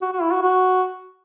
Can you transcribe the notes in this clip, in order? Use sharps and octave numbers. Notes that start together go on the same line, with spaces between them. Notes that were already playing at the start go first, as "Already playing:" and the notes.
F#4
F#4
E4
F#4
F#4